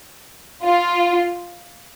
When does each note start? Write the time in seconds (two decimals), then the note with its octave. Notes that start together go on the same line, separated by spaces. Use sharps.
0.63 F4